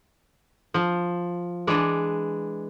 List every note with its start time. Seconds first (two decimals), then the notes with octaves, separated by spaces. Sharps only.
0.74 F3
1.67 E3 G#3 D4